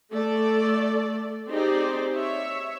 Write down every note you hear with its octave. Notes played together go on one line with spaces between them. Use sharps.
A3 A4 D5
C4 D#4 G4 G#4 C5 D5
C#5 E5